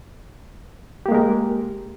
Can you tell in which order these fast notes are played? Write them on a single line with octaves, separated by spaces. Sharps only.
G4 A#3 G#3 A#4